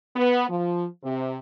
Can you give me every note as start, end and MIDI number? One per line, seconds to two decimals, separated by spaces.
0.16 0.47 59
0.49 0.86 53
1.04 1.38 48